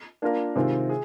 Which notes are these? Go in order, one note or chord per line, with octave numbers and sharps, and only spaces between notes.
A#3 D4 F4 A#4
C3 D#3 G#3 C4 F4
G#4